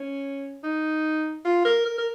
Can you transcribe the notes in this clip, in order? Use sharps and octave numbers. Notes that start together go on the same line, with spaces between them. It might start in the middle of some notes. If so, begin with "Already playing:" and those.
Already playing: C#4
D#4
F4
A#4
A#4
A#4